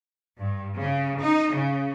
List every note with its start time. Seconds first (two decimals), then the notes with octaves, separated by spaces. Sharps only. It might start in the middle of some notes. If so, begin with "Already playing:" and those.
0.39 G2
0.78 C#3
1.20 D#4
1.54 C#3